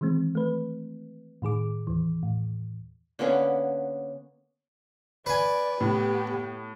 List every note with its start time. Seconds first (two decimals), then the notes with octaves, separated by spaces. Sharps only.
0.01 D#3 E3 G#3 C4
0.35 A3 B4
1.42 A2 D#3 G#4 D6
1.87 D#2 E3
2.23 A2
3.19 D3 A#3 B3 C#4
5.26 B4 D5 G#5
5.81 A2 B3 G4